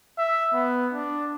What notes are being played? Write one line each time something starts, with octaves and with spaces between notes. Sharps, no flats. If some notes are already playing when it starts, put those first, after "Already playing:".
E5
B3
D4